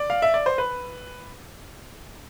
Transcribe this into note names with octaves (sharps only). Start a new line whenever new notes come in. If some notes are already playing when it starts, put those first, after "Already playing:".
Already playing: D5
F5
E5
D5
C5
B4